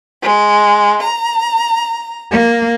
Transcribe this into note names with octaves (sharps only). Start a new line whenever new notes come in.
G#3
A#5
A#3